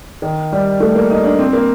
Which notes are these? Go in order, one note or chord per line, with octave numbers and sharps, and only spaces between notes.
D#3
G3
A3
A#3
D#4
D4
C4
A#3